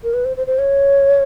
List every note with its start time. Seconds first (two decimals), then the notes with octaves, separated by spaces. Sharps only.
0.03 A#4
0.14 B4
0.25 C5
0.37 C5
0.47 C5
0.59 C#5